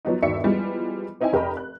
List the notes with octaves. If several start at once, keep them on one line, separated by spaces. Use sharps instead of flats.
F3 F#3 B3 D#4
G1 D#2 F#4 D5 E5 C#7
E3 F3 G3 G#3 B3
C4 D#4 E4 G5 G#5
F1 G4 A#4 D#5 B5
F#6